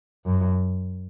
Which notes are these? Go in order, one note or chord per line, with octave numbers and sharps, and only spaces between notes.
F#2